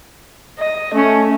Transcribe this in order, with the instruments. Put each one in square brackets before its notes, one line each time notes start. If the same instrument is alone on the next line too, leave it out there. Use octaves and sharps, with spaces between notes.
[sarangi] D#5
[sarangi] A3 [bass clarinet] C#4